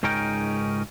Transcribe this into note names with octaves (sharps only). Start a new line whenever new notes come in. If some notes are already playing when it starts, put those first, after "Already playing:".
C#2 G#2 C#4 D#4 A#4 G5